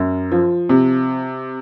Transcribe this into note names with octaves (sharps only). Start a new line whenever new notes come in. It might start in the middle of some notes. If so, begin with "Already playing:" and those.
Already playing: F#2
F3
C3